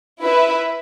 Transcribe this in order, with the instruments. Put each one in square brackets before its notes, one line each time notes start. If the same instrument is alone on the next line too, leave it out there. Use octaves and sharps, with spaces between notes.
[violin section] E4 B4 E5